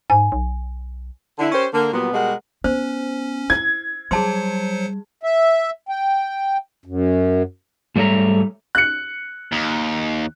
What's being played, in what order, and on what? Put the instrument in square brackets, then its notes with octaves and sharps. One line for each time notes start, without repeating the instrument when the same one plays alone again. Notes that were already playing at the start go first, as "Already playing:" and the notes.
[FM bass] G#2 [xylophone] G#5
[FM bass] B1
[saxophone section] D3 E4
C#4 G4 A#4 C5
D3 A#3 A#4
A#2 F#3 G3 B3
B2 G3 G#3 F#4 A#4 F#5
[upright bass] B3 [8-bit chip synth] C#4 [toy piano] C5
[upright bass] E4 [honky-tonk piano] G#6
[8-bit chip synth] F#3 C5 C#7 [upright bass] G3 [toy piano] G#4 A5 C6
[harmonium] E5
G5
F#2
[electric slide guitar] G#2 G3 A3 C#5 E5 A#5
[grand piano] F#6 C#7
[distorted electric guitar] D#2